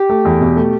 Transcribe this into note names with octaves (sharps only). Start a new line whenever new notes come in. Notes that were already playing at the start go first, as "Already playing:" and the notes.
Already playing: G4
A3
E2
B2
A3